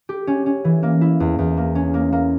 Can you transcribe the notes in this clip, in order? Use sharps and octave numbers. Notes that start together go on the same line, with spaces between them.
G4
C#4
C#4
E3
A#3
E4
E2
E2
A#3
C#4
A#3
A#3